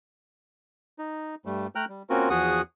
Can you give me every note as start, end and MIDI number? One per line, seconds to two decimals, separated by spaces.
0.99 1.35 63
1.45 1.67 43
1.45 1.67 55
1.45 1.67 57
1.75 1.85 57
1.75 1.85 79
1.75 1.85 82
1.75 1.85 89
1.75 1.85 90
1.89 2.03 55
2.10 2.29 58
2.10 2.29 60
2.10 2.29 61
2.10 2.29 65
2.10 2.29 66
2.10 2.29 70
2.30 2.61 40
2.30 2.61 53
2.30 2.61 66
2.30 2.61 68
2.30 2.61 78
2.30 2.61 87